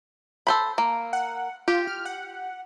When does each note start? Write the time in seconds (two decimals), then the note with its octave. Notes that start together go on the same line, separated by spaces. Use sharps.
0.47 A4 C5 B5
0.78 A#3
1.13 F#5
1.68 F4 G4
1.87 F6
2.05 F#5